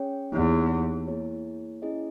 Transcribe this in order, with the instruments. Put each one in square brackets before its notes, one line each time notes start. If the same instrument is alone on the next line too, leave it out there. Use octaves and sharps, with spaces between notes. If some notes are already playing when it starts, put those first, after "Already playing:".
Already playing: [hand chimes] C#4 G#4 C#5 G5
[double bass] E2 [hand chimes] A#3 D#4 G4 C#5
[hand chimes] A#3 E4 G#4 C#5
C#4 E4 G#4 D#5